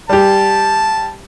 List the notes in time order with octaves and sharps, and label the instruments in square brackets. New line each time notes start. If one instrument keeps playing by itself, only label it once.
[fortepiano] G3 G4 [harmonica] A5